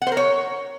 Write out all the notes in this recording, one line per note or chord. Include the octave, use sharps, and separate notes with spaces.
F#5
C5
A#4
C#5